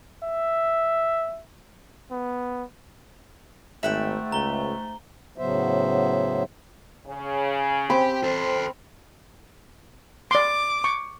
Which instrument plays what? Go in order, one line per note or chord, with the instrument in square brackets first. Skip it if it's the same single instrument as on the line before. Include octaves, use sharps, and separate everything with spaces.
[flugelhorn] E5
B3
[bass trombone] G#1 [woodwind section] G#2 A3 [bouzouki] E5 F#5 G5
[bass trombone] C#2 [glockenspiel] A#5 G7
[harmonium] A2 C#3 F#3 B3 C5 E5
[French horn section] C#3
[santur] C4 B5 [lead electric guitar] G4
[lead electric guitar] A4 C5
[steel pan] D5 C6 [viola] D6
[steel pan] C#6